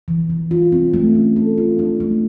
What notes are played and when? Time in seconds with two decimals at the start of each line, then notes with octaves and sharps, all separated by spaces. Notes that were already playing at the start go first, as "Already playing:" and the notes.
0.08 E3
0.30 E3
0.51 F4
0.72 C4
0.93 A3
1.15 C#4
1.36 A4
1.58 F4
1.79 D4
2.00 A3